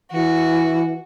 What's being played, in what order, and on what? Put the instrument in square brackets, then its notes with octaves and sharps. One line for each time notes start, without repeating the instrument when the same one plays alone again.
[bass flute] E3 [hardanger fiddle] F#4